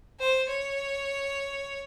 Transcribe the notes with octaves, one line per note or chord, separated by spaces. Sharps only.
C5
C#5